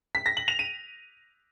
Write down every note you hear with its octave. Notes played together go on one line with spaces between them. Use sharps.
B6
A#6
F#7
F7
D#7